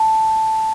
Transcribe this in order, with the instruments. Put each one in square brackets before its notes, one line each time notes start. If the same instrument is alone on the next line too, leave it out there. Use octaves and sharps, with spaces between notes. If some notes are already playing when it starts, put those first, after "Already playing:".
Already playing: [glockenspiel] A5